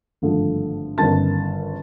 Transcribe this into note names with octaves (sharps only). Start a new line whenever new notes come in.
G#1 G2 D3 F3 A3
G1 F#2 D#3 A5 A6